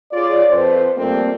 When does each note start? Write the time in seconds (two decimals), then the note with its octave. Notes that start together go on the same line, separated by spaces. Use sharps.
0.12 F4 G#4 C#5 D5
0.50 F2 B4 C5
0.97 F2 G3 A3 A#3 C4